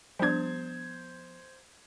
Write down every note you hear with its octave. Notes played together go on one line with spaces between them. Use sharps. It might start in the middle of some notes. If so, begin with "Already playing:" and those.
F3 G3 B3 D4 C5 G#6